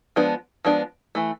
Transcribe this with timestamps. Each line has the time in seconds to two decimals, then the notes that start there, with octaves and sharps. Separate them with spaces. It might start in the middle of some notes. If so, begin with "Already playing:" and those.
0.16 F3 G#3 B3 D4
0.65 F3 G#3 B3 D4
1.15 E3 A3